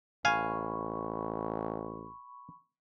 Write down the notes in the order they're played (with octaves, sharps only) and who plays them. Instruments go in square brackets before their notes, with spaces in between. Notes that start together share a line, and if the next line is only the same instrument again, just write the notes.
[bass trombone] A1 [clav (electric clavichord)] F5 G#5 [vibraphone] B5 C#6